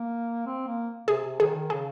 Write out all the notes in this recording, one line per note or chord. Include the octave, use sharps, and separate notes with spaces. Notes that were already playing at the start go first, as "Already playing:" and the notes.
Already playing: A#3
C4
A#3
C3 G#4
C3
D#3 G#4
D#3
C#3 G#4